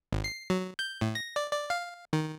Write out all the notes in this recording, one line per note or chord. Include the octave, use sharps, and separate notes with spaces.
G#1
C7
F#3
G6
A2
A#6
D5
D5
F5
D#3